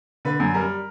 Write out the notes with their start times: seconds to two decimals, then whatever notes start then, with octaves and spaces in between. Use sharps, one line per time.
0.25 D3 B4
0.40 F#2
0.54 G3 A#4